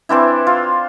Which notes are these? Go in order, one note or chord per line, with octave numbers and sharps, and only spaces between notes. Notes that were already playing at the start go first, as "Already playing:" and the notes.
E3 C4 D4 E4
F4